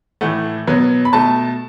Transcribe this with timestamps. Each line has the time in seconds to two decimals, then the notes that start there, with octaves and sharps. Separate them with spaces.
0.21 A2 E3 A3 F#5
0.67 B2 F#3 B3
1.05 B5
1.13 B2 A3 A5